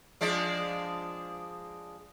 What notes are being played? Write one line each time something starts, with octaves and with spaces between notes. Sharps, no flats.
F3 G#3 D4